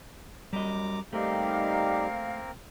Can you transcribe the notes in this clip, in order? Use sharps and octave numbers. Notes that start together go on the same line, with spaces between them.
F#2 G3 D#5 A#5 D6
G3 A3 A#3 C4 D#4 G4 A#4 F5